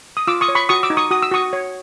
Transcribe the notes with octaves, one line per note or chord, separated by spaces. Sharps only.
D#6
F4 D6 E6
C#6 D#6
C#5
B5 C#6
F#4 C#6 D#6
D6 E6
D#4
C#6 D#6
F#4 D#6
E6
F#4 C#6 D#6
C#5